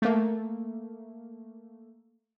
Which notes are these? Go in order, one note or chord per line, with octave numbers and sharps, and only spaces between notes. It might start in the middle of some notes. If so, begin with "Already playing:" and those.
A3 A#3